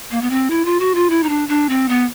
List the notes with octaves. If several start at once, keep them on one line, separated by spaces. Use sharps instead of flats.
A#3
B3
C4
E4
F4
F#4
F4
E4
D#4
D4
D4
C4
B3